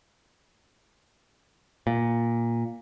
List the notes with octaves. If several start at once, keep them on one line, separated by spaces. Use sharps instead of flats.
A#2